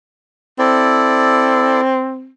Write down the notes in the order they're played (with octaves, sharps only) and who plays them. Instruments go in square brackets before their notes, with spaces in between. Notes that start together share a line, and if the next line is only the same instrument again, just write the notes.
[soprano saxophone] C4 [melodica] E4 A4 D5